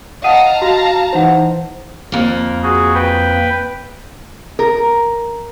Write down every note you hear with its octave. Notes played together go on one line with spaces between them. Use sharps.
D#5 F5 F#5 A5 A#5 D#6 D#7
F#4
E3 D#4 B4 C5 F#5
F2 A#3
F#4 G#4
B4 G5
A#4